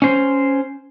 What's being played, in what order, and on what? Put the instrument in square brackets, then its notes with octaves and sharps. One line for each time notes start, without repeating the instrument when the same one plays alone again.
[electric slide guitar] C#4 C5